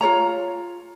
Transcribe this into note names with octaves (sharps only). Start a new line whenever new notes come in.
F4 A#4 C#5 A#5